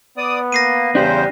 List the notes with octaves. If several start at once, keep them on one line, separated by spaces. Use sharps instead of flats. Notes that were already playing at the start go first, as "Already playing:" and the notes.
B3 D5 D#6
A#3 A#6 C7 D#7
E2 C#3 D4 G4 C5